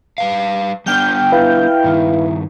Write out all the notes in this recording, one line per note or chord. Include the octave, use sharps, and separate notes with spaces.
G3 B4 F5
G3 B3 D4 G5 F6 G6
E4 B4 F5
G2 D#3